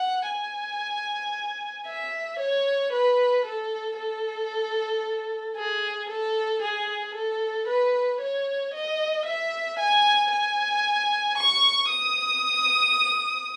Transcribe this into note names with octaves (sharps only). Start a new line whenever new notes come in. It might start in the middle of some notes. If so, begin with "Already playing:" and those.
Already playing: F#5
G#5
E5
C#5
B4
A4
A4
G#4
A4
G#4
A4
B4
C#5
D#5
E5
G#5
G#5
C#6
D#6